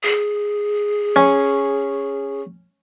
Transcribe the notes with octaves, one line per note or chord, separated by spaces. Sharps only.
G#4
C#4